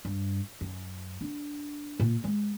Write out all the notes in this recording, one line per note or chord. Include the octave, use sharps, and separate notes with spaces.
G2
F#2
D4
A#2
G#3